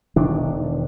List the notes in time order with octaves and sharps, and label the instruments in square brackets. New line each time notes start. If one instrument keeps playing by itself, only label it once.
[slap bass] E1 D#3 D4